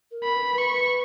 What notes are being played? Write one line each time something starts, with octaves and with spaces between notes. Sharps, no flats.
A#4
B5
B4
B4 C#6